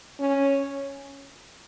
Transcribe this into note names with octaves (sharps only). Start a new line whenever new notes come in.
C#4